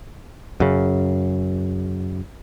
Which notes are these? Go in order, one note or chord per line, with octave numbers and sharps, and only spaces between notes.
F#2 C#3